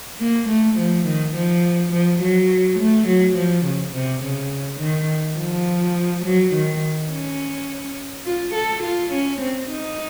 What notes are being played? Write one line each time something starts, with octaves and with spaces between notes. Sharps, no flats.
A#3
A3
F3
D#3
F3
F3
F#3
A3
F#3
F3
C#3
C3
C#3
D#3
F3
F#3
D#3
C#4
F4
A4
F4
C#4
C4
D#4